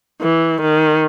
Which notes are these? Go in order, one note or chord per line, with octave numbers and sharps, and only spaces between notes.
E3
D#3